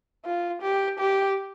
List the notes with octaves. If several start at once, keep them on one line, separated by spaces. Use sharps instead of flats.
F4
G4
G4